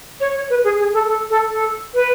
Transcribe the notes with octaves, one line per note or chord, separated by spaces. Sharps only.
C#5
C#5
B4
G#4
G#4
A4
A4
A4
A4
B4